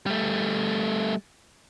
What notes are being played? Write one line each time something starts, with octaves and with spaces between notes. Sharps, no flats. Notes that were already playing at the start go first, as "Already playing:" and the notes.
G3 A3